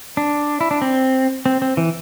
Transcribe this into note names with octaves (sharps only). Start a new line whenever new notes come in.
D4
E4
D4
C4
C4
C4
E3